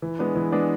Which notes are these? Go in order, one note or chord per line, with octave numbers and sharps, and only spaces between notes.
E3
G#3 B3 D4
E3
G#3 B3 D4